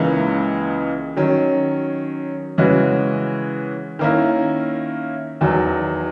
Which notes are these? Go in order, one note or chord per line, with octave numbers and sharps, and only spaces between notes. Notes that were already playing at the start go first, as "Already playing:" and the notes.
Already playing: C#2 C#3 E3 A#3 D#4
D#3 F#3 C#4
C#3 E3 G#3 C#4 F#4
D#3 A#3 C#4 E4
E2 D#3 F#3